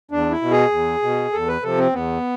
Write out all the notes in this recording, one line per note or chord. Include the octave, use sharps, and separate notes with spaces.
E2 D4
E4
B2
G#4
E2
B2
E2 A4
B4
C3 F3 A4
C4
E2 B3